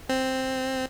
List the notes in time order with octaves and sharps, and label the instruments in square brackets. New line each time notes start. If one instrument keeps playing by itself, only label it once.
[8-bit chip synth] C4